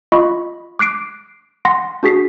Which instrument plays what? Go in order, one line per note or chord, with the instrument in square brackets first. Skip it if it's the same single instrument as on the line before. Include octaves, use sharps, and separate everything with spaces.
[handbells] F4 D#5 B5 C#6
D6 F#6 C7 D7
F#5 C6 A#6
D4 F#4 G#4 B6 C7